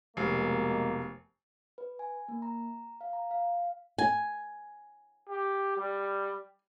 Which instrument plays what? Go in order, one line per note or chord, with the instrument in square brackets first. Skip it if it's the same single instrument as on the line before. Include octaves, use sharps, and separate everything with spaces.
[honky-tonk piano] F1 [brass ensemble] B2 G#3 A#3
[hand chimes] B4
G#5
A#3
A#5
F5
A#5
F5
[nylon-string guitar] G#5
[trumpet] G4
G3